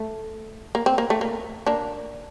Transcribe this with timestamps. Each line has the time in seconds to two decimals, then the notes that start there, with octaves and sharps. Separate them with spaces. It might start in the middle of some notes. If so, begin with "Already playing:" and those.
Already playing: A3
0.75 A#3
0.86 C4
0.98 A#3
1.10 A3
1.21 A#3
1.66 A#3 D4